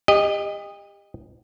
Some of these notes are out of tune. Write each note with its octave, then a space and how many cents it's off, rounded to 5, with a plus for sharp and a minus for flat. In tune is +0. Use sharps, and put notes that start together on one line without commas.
G4 +35 D#5 -10